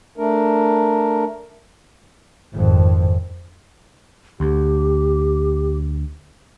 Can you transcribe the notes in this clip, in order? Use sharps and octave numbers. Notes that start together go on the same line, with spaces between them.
A3 D4 A#4
G#1 F2
D2 G4